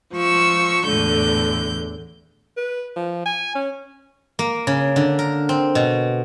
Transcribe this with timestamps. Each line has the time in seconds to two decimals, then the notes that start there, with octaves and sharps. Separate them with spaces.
0.15 F3 C#6 E6
0.86 E2 A2 D3 G6
2.57 B4
2.96 F3
3.26 G#5
3.55 C#4
4.39 A#3
4.67 C#3
4.96 D3
5.19 A#4
5.49 C4
5.75 B2